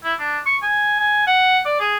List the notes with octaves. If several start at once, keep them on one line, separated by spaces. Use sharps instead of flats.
E4
D4
C#6
G#5
G#5
F#5
D5
G#4